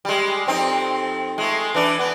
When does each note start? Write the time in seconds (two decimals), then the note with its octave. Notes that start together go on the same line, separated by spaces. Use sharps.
0.05 G3 G#3
0.47 F2 C4 D#4
1.38 G#3 A3
1.75 E3 D4
1.99 B3